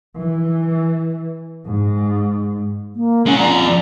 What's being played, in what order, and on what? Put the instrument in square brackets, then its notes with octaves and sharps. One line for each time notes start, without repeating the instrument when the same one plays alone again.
[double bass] E3
G#2
[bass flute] A#3
[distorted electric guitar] G#3 F#5 [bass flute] C#4
[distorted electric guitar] F2 A#5 [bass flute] D5